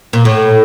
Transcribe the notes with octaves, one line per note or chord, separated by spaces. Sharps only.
A#2
A2